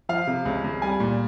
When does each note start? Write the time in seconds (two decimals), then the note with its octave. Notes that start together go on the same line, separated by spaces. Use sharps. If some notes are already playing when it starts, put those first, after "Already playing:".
0.09 F3 F5
0.27 C3
0.45 C#2
0.64 C#2
0.82 G3 G#5
1.00 A#2